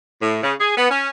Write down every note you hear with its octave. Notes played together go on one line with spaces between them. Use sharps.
A2
C#3
G#4
B3
C#4